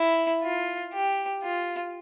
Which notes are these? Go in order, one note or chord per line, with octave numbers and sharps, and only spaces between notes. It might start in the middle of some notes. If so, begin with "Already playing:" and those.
Already playing: E4
F4
G4
F4